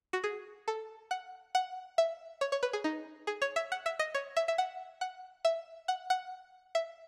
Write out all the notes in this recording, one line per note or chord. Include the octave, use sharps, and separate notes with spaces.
F#4
G#4
A4
F#5
F#5
E5
C#5
C#5
B4
G#4
D#4
G#4
C#5
E5
F#5
E5
D#5
C#5
E5
E5
F#5
F#5
E5
F#5
F#5
E5